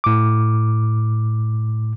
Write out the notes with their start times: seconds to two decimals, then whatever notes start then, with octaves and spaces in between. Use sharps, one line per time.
0.04 A2 D6